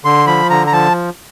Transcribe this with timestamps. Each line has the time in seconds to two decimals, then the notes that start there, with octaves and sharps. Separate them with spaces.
0.05 D3 C6
0.27 F3 B5
0.50 D3 A#5
0.67 A#5
0.72 F3 A5